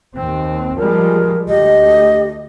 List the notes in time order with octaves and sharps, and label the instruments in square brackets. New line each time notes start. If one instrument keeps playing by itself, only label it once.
[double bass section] D#2 C4
[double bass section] F3 G3 G#3 [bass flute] A#4
[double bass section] D2 [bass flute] G4 [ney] D#5